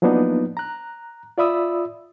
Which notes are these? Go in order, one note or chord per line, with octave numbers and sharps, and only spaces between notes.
F3 F#3 A#3 B3 D4 D#4
A#5 F#6
F4 D5 E5 B5 D#6 E6